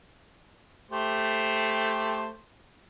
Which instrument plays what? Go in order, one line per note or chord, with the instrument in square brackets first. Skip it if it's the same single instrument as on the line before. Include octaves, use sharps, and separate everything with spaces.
[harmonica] A3 G4 C5